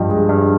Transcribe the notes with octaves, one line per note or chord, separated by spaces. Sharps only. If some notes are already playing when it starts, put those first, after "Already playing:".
Already playing: G2 F3 D#5 G5
G#3
G2